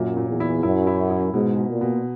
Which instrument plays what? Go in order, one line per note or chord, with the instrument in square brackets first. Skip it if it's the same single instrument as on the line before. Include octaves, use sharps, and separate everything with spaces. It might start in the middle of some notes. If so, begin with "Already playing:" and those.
Already playing: [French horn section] F#2 [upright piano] A#2 F#3
[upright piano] A#2
[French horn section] E2
[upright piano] E4
[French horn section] F#2 [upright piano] E4
[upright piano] E4
E4
[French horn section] G#2 [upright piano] B2
[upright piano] B2
[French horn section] A#2
[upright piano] B2